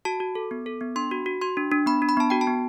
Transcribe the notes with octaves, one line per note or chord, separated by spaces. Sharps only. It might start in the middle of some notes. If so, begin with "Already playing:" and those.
F#4 A5
F#4
A4
B3
A4
B3
D4 C6
F#4
F#4
F#4 C6
D4
D4
B3 B5
D4
B5
B3 A5
F#4 G5
A5
B3